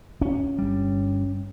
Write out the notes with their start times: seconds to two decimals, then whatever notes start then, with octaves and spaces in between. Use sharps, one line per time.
0.21 C#4
0.59 G1 G3